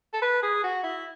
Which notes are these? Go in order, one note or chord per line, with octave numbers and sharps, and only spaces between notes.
A4
B4
G#4
F#4
E4